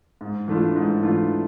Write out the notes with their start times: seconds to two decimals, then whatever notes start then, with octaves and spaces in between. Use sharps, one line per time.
0.21 G#2
0.48 E3 A3 D4 F4
0.76 G#2
1.03 E3 A3 D4 F4